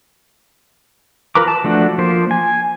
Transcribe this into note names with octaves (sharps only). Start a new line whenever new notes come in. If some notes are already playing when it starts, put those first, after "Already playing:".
F4 A#4 B4 A#5 D6
A5
F3 A3 D4 F#4
F3 A#3 C5
G#5